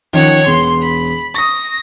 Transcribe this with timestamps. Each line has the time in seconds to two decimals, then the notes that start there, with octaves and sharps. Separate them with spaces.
0.13 D#3 F3 C#4 C#5 F#5
0.46 E1 B3 C6
0.82 B5
1.34 C#6 D#6 A#6